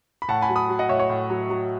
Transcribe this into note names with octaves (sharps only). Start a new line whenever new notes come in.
B5
A2 F#5 A5
G#5 B5
F#3
B5 D#6
F#3
D#5 F#5
A2 C#5 E5
C#5
A2
F#3
F#3